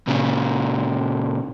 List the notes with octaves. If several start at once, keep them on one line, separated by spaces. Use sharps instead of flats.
A#2 C#3